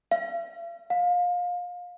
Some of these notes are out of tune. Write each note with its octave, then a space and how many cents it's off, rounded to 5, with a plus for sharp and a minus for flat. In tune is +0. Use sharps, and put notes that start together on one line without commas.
F5 -45
F5 +25